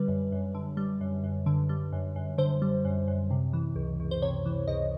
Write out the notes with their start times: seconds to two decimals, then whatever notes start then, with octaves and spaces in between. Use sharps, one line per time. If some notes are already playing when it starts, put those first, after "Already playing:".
Already playing: D3 G3 B4
0.08 F#2
0.32 F#2
0.55 D3
0.77 G3
1.01 F#2
1.24 F#2
1.46 D3
1.69 G3
1.93 F#2
2.16 F#2
2.38 D3 C5
2.62 G3
2.85 F#2
3.08 F#2
3.31 C3
3.53 E3
3.76 C#2
4.00 C#2
4.11 C5
4.22 C3 C#5
4.46 E3
4.68 C#2 D#5